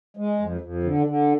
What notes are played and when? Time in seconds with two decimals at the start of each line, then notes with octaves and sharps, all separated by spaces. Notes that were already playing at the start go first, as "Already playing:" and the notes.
0.17 G#3
0.39 F2
0.61 F2
0.83 D3
1.06 D3